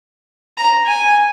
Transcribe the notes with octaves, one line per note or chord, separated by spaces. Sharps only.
A#5
G#5